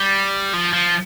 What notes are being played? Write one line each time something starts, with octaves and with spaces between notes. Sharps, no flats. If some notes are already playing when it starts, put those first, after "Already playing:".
Already playing: G3
F3
F3